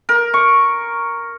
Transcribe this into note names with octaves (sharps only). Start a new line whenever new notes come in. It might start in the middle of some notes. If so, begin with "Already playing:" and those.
A#4
C#6